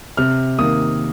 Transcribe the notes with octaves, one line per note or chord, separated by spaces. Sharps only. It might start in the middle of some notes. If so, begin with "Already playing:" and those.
C3 F6
D#3 A#3 D#6